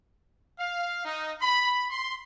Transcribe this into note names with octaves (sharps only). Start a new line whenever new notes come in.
F5
D#4
B5
C6